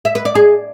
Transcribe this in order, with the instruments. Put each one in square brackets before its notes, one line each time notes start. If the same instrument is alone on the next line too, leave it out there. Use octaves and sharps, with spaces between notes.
[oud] E5
B4
D5
G#4